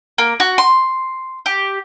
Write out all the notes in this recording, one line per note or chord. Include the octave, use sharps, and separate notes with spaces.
A#3
F#4
C6
G4